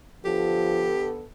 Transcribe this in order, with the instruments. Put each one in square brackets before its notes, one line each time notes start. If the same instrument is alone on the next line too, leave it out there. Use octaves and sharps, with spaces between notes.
[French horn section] D3 B3 A4 [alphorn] F3 [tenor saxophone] G4